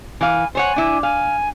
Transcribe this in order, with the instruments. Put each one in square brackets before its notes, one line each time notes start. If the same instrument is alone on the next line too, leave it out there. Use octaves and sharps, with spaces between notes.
[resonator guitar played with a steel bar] E3 F5 [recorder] G#5
[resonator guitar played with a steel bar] C5 C#5 F#5 [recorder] G#5
[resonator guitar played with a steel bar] D4 E4
[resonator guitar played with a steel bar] F5 [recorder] G#5